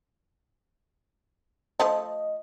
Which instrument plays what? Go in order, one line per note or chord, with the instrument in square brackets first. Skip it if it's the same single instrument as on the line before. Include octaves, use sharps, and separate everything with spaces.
[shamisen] F3 A3 A4 [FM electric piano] D#5